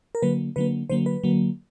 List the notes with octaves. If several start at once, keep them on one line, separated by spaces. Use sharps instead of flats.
A#4
D3 F#3 A#3 B4
D3 F#3 A#3 B4
D3 F#3 A#3 C5
B4
D3 F#3 A#3